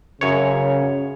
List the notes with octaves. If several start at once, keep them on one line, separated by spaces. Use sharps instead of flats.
F#2 C#3 C#5